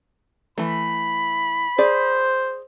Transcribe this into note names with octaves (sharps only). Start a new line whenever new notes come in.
E3 A3 B5
G#4 C5 D5